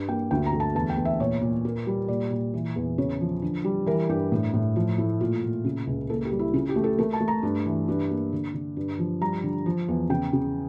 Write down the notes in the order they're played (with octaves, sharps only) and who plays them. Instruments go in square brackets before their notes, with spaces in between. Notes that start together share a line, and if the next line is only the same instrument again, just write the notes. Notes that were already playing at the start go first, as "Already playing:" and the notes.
Already playing: [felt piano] G2
A#3 G5
D2 G5
A#5
A3
A5
E2 A5
G5
E2
E5
A#2 C#5
A#2
A#3
G3
A#2 D5
A#2
E3
E2
C#3 C#5
F3
D3
G3
E3 A#4
G2 G4
A2
A2
F3 F4
A3 E4
A#2 F4
A#2
C#3
C#2
A#3 A4
G4
G3
E4
C#3 F4
G4
A3
A4
A3 A#4
A5
A3
A#5
G2
E3
G2
A#3
D3
D3
G2
F3
G3 A#5
D3
F3
E2
C#3 G5
C#3